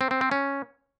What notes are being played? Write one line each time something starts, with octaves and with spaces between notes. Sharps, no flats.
C4
C4
C4
C#4